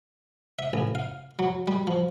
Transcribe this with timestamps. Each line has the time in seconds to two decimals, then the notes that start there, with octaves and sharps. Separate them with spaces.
0.59 E5
0.73 A1
0.95 F5
1.39 F#3
1.68 G3
1.87 F3